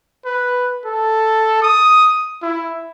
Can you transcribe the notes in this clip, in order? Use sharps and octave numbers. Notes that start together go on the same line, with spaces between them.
B4
A4
D#6
E4